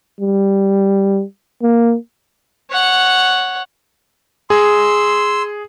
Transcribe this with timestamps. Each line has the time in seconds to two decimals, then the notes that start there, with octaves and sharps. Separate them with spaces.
0.21 G3
1.63 A#3
2.70 C#5 F#5
4.50 G#4 C6 E6